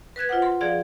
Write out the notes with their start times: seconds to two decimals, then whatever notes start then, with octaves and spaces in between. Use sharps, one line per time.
0.16 B4 F#6 G#6 A6
0.29 F4 C5 F#5
0.42 C6
0.61 F3 G#4 D5 F5